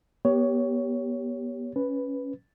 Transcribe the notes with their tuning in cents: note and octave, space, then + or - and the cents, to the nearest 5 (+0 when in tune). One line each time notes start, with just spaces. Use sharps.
B3 -30 G4 +0 C#5 +15
C#4 +0 B4 +0